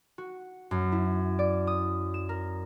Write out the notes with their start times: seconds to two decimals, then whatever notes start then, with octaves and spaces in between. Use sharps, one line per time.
0.18 F#4
0.71 F#2
0.92 E4
1.39 D5
1.67 D#6
2.14 E7
2.29 A#4